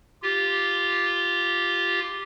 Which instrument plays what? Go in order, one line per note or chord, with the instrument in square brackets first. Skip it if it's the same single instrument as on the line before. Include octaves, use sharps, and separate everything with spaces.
[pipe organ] F4 G4